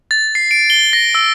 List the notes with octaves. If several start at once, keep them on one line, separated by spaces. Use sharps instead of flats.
A6
C7
D7
G7
A#6
E6